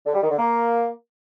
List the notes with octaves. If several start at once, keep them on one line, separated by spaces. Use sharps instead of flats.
D3
G3
D#3
D3
A#3